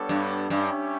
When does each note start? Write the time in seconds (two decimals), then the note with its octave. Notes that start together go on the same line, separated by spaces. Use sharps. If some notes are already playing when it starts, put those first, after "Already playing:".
Already playing: G3 B3 D4 A4 C#5
0.09 G2
0.50 G2 G3 C#4 G4 C#5 E5